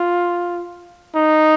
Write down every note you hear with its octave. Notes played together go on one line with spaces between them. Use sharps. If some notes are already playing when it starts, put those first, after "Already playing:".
Already playing: F4
D#4